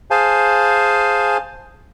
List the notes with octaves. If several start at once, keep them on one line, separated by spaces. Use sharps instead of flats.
G#4 C5 F5 G#5 A5